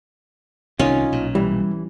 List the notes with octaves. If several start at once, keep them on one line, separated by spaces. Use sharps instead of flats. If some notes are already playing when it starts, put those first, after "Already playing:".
C2 C3 D#3 C#4 D#4 F4
B1 A#2
E3 G3